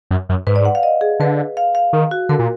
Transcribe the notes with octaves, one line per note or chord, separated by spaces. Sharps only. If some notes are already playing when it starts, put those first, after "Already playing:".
F#2
F#2
G#2 B4
D5
F#5
F5
D#5
G#4
D3 B4
F5
F5
D#3
F#4
D3 A#4
A#2